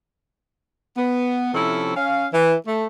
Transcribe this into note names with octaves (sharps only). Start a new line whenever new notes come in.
B3
C3 F3 C#4 E4 A4
C#4 F5
E3
A3